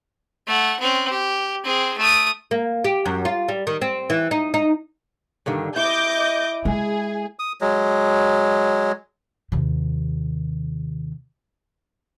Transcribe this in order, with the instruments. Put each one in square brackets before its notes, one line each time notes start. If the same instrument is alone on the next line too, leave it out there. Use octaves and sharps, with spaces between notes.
[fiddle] A3 F#5
C4 C#4
G4
C4 G#4
A3 D#6
[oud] A#3
G4
F#2
F4
G3
D#3
C4
E3
D#4
D#4
[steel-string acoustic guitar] G2 D3 D#3
[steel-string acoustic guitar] E4 [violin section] D#5 D6 G6
[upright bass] G#3 [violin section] G#4
[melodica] D#6
F#3 G#3
[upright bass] D#2 C3